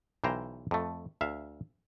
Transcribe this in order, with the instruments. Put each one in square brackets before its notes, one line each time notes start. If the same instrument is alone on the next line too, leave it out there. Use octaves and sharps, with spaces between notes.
[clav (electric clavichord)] B1 E3 C5 G5 A#5
F2 A3
D2 E5 F5